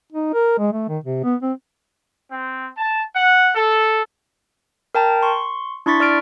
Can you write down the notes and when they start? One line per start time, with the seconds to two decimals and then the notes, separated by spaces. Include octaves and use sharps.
0.12 D#4
0.33 A#4
0.58 G#3
0.72 A3
0.88 D#3
1.04 C3
1.23 B3
1.42 C4
2.30 C4
2.78 A5
3.15 F#5
3.55 A4
4.95 A#4 G5 A5 A#5
5.22 C6 C#6
5.86 D4 E4 C6 C#6 A6 B6
6.00 D5 F6 D7